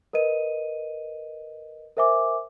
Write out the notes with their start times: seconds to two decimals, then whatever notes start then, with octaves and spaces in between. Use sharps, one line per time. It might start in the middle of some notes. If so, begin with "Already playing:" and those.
0.13 A#4 B4 D#5 D#7
1.97 A#4 C5 E5 G#5 D6